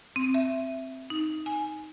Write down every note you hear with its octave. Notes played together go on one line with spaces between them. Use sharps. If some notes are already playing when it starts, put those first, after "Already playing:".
C4
E5
D#4
G#5